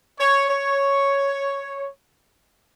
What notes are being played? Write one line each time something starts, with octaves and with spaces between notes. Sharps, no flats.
C#5
C#5